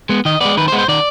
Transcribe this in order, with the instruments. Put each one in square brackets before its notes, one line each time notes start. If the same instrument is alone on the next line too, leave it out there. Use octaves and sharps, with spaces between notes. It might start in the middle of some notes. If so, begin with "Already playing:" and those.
[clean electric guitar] G#3 B3
D#3 D#5
G#3 B3 D5
D#3 B4
C5
G#3 B3
C5
D#3 D5